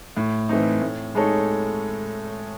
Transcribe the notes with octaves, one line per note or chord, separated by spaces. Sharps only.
A2
E3 A3 C4 D#4
A2
G#3 D#4 A4 C#5